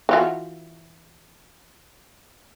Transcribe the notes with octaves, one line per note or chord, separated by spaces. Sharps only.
E3 F4 F#4